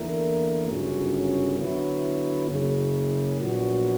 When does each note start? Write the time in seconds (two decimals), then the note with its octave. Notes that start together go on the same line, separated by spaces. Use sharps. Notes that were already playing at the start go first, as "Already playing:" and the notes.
Already playing: E2 D3 A#3 E4 A#4
0.68 G1 F#2 C#3 F#3 C#4
1.58 D3 F#3 B3 E4
2.49 F#1 F#2 C#3
3.39 A#1 A#2 F#3 B3 F#4